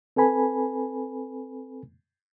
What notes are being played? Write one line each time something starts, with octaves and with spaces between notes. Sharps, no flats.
C4 A4 B4 G#5 B5